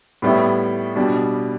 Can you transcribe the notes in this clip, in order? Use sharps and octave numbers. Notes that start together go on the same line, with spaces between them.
A2 G3 B3 E4
B2 G3 D4